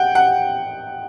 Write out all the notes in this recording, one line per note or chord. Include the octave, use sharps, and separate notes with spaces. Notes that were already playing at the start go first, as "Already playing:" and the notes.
Already playing: F#5 G5
F#5